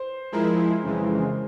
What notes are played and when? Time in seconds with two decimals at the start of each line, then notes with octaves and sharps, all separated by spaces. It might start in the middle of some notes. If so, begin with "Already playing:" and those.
Already playing: C5
0.32 F3 G#3 E4 A#4
0.83 F2 C#3 E3 G#3